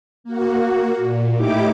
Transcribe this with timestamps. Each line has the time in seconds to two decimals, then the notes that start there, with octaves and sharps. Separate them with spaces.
0.24 A#3 F#4
0.97 A#2
1.35 A2 D#4 E4 G4 D6